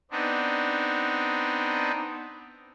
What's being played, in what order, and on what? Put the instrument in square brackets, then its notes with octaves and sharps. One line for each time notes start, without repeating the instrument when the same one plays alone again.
[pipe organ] B3 C4 D4 D#4